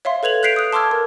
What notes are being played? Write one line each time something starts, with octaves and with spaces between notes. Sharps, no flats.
C#5 E5 F5 C6
A4 B4 G#6 F7 F#7
F#6 G6 B6 C7 D7 F7
D#6 F#6
A5 C6 D6 E6 F6 G#6
A#4